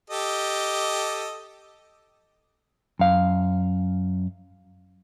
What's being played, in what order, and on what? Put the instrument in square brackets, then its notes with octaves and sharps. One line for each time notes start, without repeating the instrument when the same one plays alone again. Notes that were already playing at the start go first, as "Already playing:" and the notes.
[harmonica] G4 A4 D#5
[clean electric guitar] F#2 F5